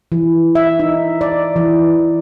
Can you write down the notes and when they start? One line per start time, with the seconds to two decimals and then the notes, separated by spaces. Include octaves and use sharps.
0.12 E3
0.55 E5
0.80 D#4
1.21 D5
1.56 E3